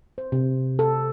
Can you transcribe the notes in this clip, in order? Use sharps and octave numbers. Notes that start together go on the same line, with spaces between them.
C5
C3
A4